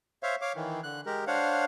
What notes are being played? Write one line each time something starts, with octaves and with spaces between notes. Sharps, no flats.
C5 C#5 E5 F5
C#5 F5 D6
D#3 E3
D3 F#6
G#3 G4 A#4
D4 C5 C#5 F5 F#5